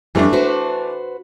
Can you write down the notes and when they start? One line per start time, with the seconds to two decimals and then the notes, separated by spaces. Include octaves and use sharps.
0.15 F2 E3 G3 A3 D4
0.33 F#4 B4 C5